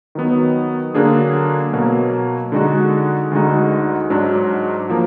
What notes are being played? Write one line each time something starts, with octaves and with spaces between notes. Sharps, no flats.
D#3 F#3 B3
D3 F#3 A#3 D4 G#4
B2 F#3 A#3
D3 G#3 D#4 F#4
D2 D3 G#3 D#4 F#4
G#2 F#3 D4
F3 A#3